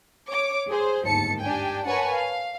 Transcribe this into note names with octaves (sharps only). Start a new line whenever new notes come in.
C#5 D6
G#4 C5
G1 D#2 G#2 A5 C#7
D4 G4 G5 G#5
A#4 B4 C#5 F#5 G#5 A5
F5